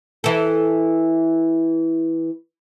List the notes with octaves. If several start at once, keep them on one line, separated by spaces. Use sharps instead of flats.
E3 A4